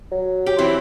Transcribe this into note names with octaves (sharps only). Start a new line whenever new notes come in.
F#3
G4
E3 C4 E4